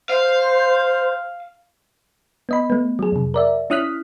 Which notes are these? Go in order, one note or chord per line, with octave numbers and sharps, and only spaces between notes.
C5 F5
B3 D#5 B5
A3 B3
F#3 G#4
F2 C3
A#4 D5 E5
C#4 E4 D#6 F6 F#6 B6